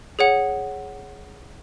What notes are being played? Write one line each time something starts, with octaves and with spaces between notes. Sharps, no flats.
G#4 C#5 F#5